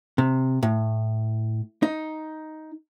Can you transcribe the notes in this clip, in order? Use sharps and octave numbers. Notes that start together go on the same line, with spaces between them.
C3
A2
D#4